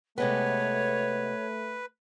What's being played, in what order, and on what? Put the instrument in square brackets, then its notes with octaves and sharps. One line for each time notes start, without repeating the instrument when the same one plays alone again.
[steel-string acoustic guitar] C3 G#3 B3 [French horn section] A3 [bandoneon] B4 [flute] C#5